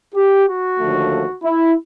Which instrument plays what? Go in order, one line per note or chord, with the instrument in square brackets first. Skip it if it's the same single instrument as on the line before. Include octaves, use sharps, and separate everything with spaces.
[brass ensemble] G4
F#4
D#2 D3 F3 A3
E4